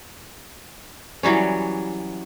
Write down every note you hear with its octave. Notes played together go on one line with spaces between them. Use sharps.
E3 F#3 G3 C#4